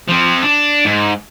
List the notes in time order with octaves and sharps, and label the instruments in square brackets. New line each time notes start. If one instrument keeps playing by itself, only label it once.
[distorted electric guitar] F3 C4
D4
G#2